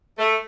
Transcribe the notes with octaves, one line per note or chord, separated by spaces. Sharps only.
A3